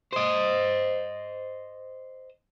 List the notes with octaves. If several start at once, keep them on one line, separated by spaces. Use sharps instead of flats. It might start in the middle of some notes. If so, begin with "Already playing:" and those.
C5 D#5